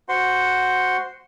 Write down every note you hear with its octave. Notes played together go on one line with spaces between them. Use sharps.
F#4 C5 F#5 C6